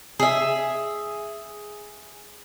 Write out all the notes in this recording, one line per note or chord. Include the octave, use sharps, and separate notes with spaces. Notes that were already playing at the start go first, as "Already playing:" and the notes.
G#4 E5